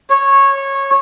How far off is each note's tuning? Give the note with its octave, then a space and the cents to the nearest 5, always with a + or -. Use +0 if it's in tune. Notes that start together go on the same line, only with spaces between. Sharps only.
C#5 -15